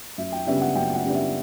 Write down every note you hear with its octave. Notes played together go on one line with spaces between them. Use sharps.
F#2 E5
G5
C#3 G3 B3 D4 E5
F#5
F#2 G5
F#5
C#3 G3 B3 D4
E5